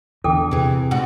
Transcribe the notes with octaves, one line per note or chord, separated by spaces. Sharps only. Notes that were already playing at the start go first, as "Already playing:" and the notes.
E2 D3 A4 G5 D6
C3 E3 G#4
G#2 F#4